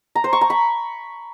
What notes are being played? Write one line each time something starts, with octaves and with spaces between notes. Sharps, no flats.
A#5
C5
C#6
A#5
B5